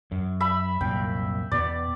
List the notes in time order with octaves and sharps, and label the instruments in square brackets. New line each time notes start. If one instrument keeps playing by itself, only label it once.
[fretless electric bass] F#2
[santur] E5 B5
[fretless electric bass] C2 F#2 A#2 [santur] G5
[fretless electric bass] E2 B2 B3 [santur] D5